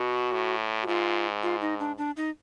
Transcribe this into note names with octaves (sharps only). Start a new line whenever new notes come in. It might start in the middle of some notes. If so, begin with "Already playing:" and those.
Already playing: B2 F#4
A2
F#4
G#2 F4
F4
D#4
D4
D4
D#4